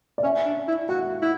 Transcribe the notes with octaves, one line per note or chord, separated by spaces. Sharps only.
D5
C#4 E5
D4
E4
F#4 F#5
E4